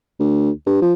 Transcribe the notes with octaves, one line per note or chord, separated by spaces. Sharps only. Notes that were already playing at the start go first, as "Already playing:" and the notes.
D2
G2
F3